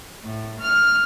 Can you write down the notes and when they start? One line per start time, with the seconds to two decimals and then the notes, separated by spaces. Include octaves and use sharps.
0.23 A2
0.60 F6